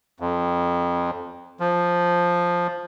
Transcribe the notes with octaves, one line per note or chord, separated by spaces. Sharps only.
F2
F3